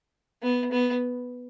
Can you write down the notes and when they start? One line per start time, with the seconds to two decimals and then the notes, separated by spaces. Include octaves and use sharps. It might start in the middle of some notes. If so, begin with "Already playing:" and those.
0.43 B3
0.72 B3